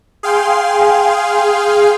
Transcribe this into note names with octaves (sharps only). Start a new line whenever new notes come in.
G#4 F5 G5 C6